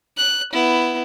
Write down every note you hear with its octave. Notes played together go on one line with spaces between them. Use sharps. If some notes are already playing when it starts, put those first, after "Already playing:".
F#6
B3 E4